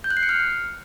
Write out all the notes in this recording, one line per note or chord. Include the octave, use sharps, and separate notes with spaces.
G6
F#6
C7
C#7
F6